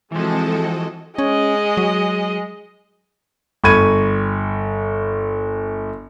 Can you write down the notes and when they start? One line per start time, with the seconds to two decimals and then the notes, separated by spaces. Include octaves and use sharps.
0.12 E3 F3 G#3 C4 F#4 A4 D#5
1.18 G#3 C#4 D#5
1.77 F#3
3.64 G1 B5 C#6 G#6 D#7